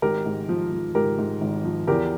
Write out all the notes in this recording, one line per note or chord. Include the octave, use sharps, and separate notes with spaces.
G#1 G4 A#4
G#2
F3
F3
G#2 G4 A#4
G#2
G#1
F3
E2 G4 A#4